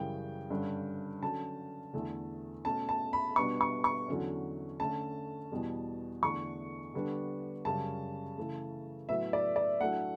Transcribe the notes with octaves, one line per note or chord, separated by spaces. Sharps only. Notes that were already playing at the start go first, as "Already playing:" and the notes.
Already playing: F#2 C#3 E3 G3 G5
G2 D3 G3 C#4
D3 F#3 C#4 A5
E2 D3 A3
B2 A3 C#4 A5
A5
B5
B2 G3 B3 D4 C#6
C#6
C#6
E2 D3 F#3 C#4
D3 A3 C#4 A5
E2 B2 G3
E2 D3 A3 D4 C#6
D3 G3 B3 D4
F#2 C#3 G3 C#4 A5
C#3 E3 A3
A2 F#3 B3 E5
D5
D5
A2 F#3 A3 D4 F#5